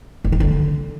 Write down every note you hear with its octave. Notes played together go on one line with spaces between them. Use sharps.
E3
D#3
D3